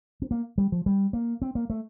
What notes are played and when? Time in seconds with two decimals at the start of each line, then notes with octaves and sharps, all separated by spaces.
0.22 C4
0.31 A#3
0.58 G3
0.72 F3
0.86 G3
1.13 A#3
1.42 C4
1.55 A#3
1.70 A3